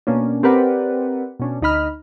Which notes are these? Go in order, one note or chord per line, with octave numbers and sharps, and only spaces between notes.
B2 A#3 C#4 D4
C4 G4 A#4 B4 D5 F#5
B2 C#4 D4
D2 D#4 D#5 B5 F6